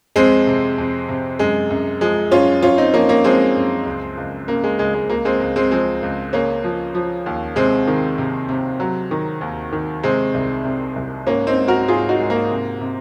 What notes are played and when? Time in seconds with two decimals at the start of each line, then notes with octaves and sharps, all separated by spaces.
0.16 F2 G#3 C4
0.47 C3
0.78 F2
1.09 C3
1.39 F#2 G#3
1.70 F#2
2.01 F3 G#3
2.32 F#2 C#4 F4
2.62 F#2 C#4 F4
2.78 C4 D#4
2.94 F3 A#3 C#4
3.09 A#3 C#4
3.24 F3 G#3 C4
3.55 F#2
3.86 C#2
4.17 C#2
4.48 C#3 A#3
4.64 G#3
4.79 C#2 G#3
4.94 G#3
5.09 C#2 A#3
5.25 G#3 C4
5.40 C#2
5.56 G#3 C4
5.71 F3 G#3 C4
6.02 C#2
6.33 C#3 A#3 C#4
6.64 F3
6.95 F3
7.26 D#2
7.56 C3 G#3 C4
7.88 D#3
8.18 C3
8.49 C3
8.80 F#3
9.11 D#3
9.41 D#2
9.73 D#3
10.03 C3 G#3 C4
10.34 C2
10.65 C3
10.96 C2
11.27 G#2 A#3 C#4
11.47 C4 D#4
11.58 G#2
11.68 F#4 A#4
11.88 G#2 F4 G#4
12.09 D#4 F#4
12.19 G#2
12.30 A#3
12.50 C3
12.81 C3